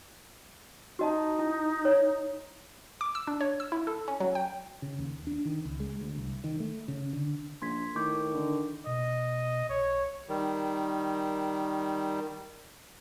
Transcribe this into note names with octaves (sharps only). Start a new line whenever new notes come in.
D#4 F#4 D#5 A5
E4
C#5
D6
E6
D4
C#5
E6
E4
A4
C#4
F#3
G5
C#3
D#2
D4
D#3
C#2
G#3
D2
C2
D#3
A3
C#3
D3
A#1 C6 G#6 B6
A2 D#3 C#6 D6 G6
D3
B2 D#5
B1 C#5
D#3 G3